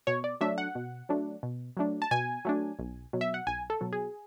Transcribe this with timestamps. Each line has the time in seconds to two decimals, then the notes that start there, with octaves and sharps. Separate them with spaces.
0.07 B2 C#5
0.24 D5
0.41 F#3 A3 D4 E5
0.58 F#5
0.75 B2
1.09 F#3 A3 D4
1.43 B2
1.77 F#3 A3 D4
2.02 A5
2.11 B2 G#5
2.45 F#3 A3 D4
2.79 B1
3.13 B2 F#3
3.21 E5
3.34 F#5
3.47 B1 G#5
3.70 A4
3.81 B2 F#3
3.93 G#4